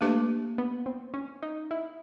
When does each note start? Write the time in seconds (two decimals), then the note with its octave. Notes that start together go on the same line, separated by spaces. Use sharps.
0.01 A3 A#3 D4 G4 B4 D5
0.58 B3
0.86 C4
1.14 C#4
1.43 D#4
1.71 E4